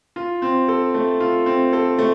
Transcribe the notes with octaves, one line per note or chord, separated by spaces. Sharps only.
F4
C4
A4
A3
F4
C4
A4
A3